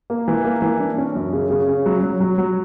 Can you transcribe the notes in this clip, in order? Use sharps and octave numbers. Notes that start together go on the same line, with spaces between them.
A#3
E3
A#3
E3
D4
C#4
F#2
C#3
C#3
C#4
F#3
F#3
F#3
F#3